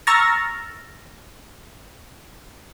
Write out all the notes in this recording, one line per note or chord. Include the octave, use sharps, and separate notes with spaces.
A#5 C#6 E6 F6 A6 A#6